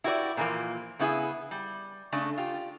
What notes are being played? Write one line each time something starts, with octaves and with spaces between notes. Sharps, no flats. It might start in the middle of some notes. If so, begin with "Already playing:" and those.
E4 F#4 G4 B4 D5
A#2 D3 E3 F3 A#3
C#3 B3 E4 G#4
G3
C#3 A3 D4
F4 G4